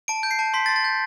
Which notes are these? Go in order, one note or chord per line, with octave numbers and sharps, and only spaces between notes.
A5 D7
G6
C7
A5
C6 B6
A6
C6
A6
G6